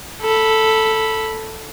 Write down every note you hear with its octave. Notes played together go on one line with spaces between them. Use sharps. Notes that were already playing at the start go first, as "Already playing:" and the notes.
A4 B5